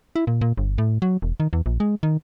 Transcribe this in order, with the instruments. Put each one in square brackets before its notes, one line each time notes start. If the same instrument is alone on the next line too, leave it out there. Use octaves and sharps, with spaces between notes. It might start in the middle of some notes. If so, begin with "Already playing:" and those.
[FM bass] E4
A#2
A#2
G1
A2
F#3
E1
D#3
E2
A#1
G#3
D#3